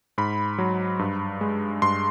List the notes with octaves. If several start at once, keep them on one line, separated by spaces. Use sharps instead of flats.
G#2 B5
F#3
G2
G#3
G2 C6